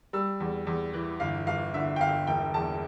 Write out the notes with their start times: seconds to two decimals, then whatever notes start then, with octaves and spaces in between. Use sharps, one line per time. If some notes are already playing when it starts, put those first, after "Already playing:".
0.13 G3 E6
0.40 E2
0.67 E2
0.93 E3
1.20 G1 F5
1.47 G1 F5
1.74 D3 E5
1.96 G5
2.01 G1 F5
2.27 E1 G5
2.54 E2 A5